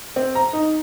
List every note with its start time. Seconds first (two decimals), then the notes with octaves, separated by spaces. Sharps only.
0.16 C4
0.35 A#5
0.53 D#4